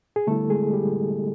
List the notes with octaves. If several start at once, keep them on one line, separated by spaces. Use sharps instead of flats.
G#4
D3 G3 A3 B3 E4 A4
G#3 G#4
G3 G4